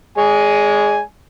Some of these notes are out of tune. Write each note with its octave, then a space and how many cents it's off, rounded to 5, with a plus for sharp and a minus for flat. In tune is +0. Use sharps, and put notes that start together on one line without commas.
G#3 +0 D5 -45 G#5 +0